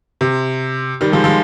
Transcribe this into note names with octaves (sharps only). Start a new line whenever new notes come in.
C3
D#3 G3
F3 G#3
F3 G#3